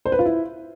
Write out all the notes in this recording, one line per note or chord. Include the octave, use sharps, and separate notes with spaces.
C5
B4
F4
E4